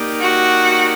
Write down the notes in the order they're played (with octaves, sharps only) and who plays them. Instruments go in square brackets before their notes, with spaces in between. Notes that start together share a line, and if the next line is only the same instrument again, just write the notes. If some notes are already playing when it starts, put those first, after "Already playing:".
Already playing: [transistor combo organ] A#3 D#4 G4 D5
[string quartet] F#4